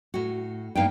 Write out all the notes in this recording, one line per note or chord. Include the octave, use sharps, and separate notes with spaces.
A2 F#4
G2 A#3 B3 D#4 F5 G5